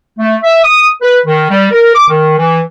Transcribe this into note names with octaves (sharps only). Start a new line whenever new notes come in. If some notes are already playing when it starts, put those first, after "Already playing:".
A3
E5
D#6
B4
D#3
G3
A#4
D6
D#3
E3